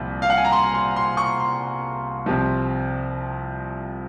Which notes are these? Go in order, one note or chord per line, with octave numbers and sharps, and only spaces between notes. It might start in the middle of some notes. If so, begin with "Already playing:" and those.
Already playing: C2 A#2 F3
F5
F#5
G#5
A#5
C6
C6
C6
C#6
C6
C2 C3 F3